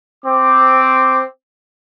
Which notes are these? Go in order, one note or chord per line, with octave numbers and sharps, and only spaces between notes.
C4 D6